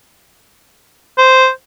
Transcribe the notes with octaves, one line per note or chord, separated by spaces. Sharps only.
C5